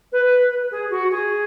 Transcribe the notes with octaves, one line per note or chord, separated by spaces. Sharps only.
B4
G#4
F#4
G#4